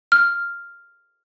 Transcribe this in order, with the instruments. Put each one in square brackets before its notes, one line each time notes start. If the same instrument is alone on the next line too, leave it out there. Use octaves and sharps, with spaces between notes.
[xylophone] F6